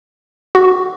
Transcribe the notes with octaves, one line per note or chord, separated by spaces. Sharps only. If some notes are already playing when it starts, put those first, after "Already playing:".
F#4